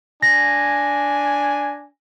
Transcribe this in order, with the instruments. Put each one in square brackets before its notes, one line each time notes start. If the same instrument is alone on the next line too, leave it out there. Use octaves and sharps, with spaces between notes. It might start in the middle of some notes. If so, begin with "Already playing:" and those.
[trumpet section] D4 G#5 [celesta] A#6